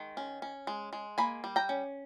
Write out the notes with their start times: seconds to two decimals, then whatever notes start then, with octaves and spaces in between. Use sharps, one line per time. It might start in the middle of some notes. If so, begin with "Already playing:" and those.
Already playing: D#3 G#3
0.17 C#4
0.42 C#4
0.67 G#3
0.93 G#3
1.18 A#3 G#5 B5
1.44 G3
1.56 G5 A#5
1.69 C#4